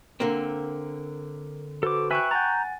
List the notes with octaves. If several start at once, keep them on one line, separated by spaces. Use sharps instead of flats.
D3 A#3 C4 A#4
F#4 A4 B4 C5 D6
B4 E5 G5 G#5 C#6 F#6
F#5 G#5 A#5 G6 A6